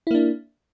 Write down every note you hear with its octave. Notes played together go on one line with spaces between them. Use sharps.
A#3 D4 E4